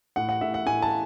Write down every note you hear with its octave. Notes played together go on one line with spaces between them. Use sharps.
A2 F#5
F#5
A2 E5
F#5
A2 G#5
A5